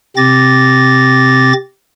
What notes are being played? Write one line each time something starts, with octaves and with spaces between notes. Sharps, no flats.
C3 C4 D6 A6 A#6